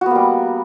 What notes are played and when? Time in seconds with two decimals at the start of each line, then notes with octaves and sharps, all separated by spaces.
0.01 F#4
0.06 B3
0.11 A#3
0.15 G3